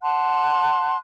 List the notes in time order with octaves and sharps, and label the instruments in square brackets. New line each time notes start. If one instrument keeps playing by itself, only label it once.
[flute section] F#5 A5 C6 F#6